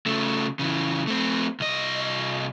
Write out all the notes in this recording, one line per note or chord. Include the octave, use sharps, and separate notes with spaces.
C#3 A3
C#3 E3
A3 C4
C2 D#5